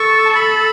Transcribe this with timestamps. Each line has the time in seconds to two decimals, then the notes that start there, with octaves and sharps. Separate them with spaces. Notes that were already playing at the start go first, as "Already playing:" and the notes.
Already playing: A4 C#6
0.25 A5
0.35 B5